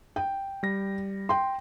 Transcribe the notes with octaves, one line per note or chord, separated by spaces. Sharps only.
G5
G3 A#6
G5 C6